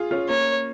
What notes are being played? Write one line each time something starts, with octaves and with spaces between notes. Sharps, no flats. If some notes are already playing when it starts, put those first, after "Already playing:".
Already playing: F4 G#4
C#4 F4
A#3 C#4 C#5